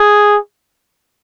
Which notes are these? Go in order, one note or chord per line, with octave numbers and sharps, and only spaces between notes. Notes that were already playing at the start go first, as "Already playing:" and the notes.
Already playing: G#4